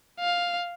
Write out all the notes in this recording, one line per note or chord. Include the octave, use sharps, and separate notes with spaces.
F5